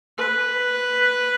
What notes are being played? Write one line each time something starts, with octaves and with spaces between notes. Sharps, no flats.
B4